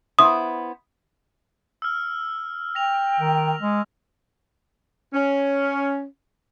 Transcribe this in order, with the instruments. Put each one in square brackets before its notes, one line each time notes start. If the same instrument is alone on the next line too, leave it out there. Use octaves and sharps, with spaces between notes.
[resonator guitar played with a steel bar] B3 E4 C5 [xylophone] D#6
[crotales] E6 F6
[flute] G5 [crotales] A#6 F7
[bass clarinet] D#3
G#3
[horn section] C#4